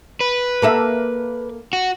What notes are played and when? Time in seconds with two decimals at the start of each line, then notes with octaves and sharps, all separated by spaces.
0.21 B4
0.62 A#3 A4 E5
1.73 F#4